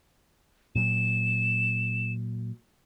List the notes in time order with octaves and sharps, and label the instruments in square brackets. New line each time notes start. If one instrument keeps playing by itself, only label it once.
[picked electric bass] A#2 F#3 [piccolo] E7